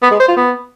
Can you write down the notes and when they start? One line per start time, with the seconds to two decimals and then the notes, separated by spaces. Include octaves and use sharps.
0.03 B3
0.11 G#3
0.20 C5
0.28 F4
0.37 B3